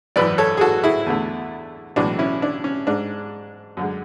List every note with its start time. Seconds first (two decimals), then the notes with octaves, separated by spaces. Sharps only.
0.16 G#1 F#2 E3 B4 D5
0.38 A4 C#5
0.57 G#4
0.61 F#4 A4
0.83 E4 G#4
1.06 E2 D3 A3
1.96 B1 A2 E3 G#3 D4 F#4
2.19 C#4 E4
2.42 D4
2.64 C#4
2.87 G#2 G#3 D4
3.77 F#2 D3 G#3